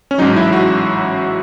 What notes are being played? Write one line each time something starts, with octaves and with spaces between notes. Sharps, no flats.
C#4
A1 G#2 F#3 D#4
E4
E4
F#4